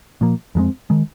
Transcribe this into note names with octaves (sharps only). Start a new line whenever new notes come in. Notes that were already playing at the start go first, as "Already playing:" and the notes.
A#2 F3 A#3
F2 F3 G#3 C4
D#3 G#3